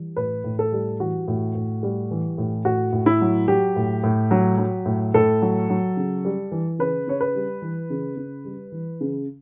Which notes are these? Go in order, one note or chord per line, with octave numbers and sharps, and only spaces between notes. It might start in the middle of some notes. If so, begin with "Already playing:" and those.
Already playing: E3 G3
A2 B4
A2
A4
G3
E3 F#4
A2
A2
G3
E3
A2
A2 F#4
A2
E4
F#3
F#3 G4
A2
A2
F#3
F#3
A2
A2 A4
F#3
F#3
C#3
G3
E3
C#3 B4
C#3 C#5
B4
G3
E3
C#3
C#3
G3
E3
C#3